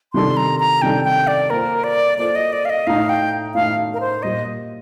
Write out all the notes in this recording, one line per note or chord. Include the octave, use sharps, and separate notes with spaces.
C3 D#3 G3 D4 A4 C6
A#5
A#5
C3 D#3 G3 D4 A4 G5
G5
D5
A#3 F4 A4 A#4 C5
D5
A#3 F4 A4 C5 D5
D#5
D5
F5
D#5
A2 A3 D#4 F5
G5
A2 A3 D#4 F5
A#4
C5
A#2 G3 A#3 D#5